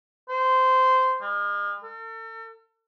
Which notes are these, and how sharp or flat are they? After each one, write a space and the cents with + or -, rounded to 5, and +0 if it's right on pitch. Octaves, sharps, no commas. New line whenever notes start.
C5 -15
G#3 -45
A4 +40